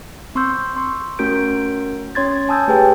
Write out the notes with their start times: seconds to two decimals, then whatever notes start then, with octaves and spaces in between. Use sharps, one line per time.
0.35 C4 C6 C#6 E6 G6
0.77 C6 C#6
1.19 A3 C#4 F#4 A#4 G6 D7
2.15 C#4 C#5 C6 G#6 A6
2.49 G#5 A5 D#6 E6 G6 A6
2.67 A3 G4 G#4 B4 C#5 G5